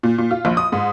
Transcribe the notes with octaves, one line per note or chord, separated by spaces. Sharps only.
A#2
A#2
F4
A#1
D#6
G#2